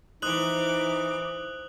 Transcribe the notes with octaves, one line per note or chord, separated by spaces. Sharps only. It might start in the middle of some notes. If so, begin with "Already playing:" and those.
E3 D#4 C5 D6 D#6 F#6 F#7